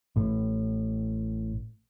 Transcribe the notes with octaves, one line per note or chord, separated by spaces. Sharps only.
A1 A2